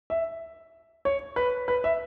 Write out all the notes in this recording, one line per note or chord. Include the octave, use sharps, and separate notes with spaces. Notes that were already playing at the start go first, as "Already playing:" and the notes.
E5
C#5
B4
B4
E5